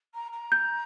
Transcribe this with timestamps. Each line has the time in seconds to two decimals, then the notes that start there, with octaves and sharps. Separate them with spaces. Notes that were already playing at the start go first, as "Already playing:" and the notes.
0.14 A#5
0.32 A#5
0.52 G6